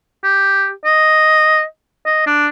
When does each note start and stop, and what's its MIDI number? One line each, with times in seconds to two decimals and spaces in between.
0.24 0.70 67
0.85 1.63 75
2.06 2.26 75
2.26 2.47 62